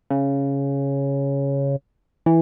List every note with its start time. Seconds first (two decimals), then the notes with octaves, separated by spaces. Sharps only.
0.10 C#3
2.26 E3